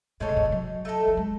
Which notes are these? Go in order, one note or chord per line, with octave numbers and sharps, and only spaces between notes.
A2 G#3 D#4 A4 C#5
B2
A2
B2
F#3
A3 D#4 A4
F#3
G#3